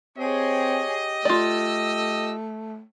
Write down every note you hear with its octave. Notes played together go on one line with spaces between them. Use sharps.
C4 G4 G#4 C#5 D#5
A3 F4 D5 E6